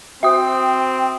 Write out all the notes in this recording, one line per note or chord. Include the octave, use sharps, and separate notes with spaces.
C4 F#4 C5 E5 G5 D#6